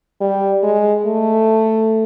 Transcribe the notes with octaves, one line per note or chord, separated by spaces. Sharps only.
G3
G#3
A3